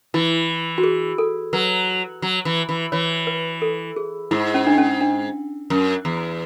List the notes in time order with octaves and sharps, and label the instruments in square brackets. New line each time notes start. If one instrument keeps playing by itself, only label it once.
[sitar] E3 [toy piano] E4
[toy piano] F#4
G#4
A4
[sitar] F#3 [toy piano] B4
[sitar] F#3
E3
E3
[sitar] E3 [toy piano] C#5
[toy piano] B4
A4
G#4
[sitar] G#2 [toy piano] E4
[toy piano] C#4
D4
C#4
D4
[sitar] F#2
E2